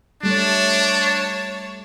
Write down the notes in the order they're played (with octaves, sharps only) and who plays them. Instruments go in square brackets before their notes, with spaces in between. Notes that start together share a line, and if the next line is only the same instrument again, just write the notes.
[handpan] G3 A3 [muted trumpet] D4 [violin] C#5 A5